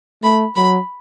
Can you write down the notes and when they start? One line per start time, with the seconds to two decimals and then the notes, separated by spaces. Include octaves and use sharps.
0.23 A3 B5
0.56 F#3 B5